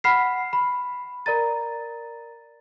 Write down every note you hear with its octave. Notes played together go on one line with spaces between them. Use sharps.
F#5 B5 F6 B6 C7
B5
A#4 D5 A#5 A6